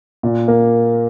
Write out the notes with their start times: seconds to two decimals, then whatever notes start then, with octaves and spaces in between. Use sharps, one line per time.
0.23 A#2
0.48 A#3